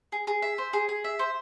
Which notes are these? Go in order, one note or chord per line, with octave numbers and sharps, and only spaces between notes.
G#4
G#4
E5
C5
G#4
G#4
E5
C5